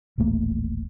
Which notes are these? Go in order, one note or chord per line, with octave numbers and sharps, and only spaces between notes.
D#1 A1 A3 A#3